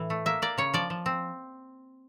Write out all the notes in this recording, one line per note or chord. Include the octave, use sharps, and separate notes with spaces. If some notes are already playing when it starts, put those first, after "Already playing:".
Already playing: A2 E3
A3
A#3 E5
A#3 D5
C#3 C#5
F3 D5
F3
C4